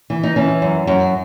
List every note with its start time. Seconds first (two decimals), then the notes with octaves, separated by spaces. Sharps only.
0.10 E3
0.23 D#4
0.36 E3 C#4
0.62 F#2
0.87 F#2